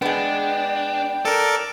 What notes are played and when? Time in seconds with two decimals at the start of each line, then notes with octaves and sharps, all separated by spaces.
0.02 G#3 B3 D4 G5
1.25 A4 A#4 D5